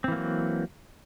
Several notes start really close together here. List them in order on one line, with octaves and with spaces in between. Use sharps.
C4 E3 A#3 F#3